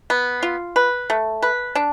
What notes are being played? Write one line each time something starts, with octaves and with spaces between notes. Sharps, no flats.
B3
F4
B4
A3
B4
D4